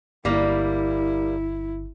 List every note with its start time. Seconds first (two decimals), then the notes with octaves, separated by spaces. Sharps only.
0.25 G1 G3 A#3 E4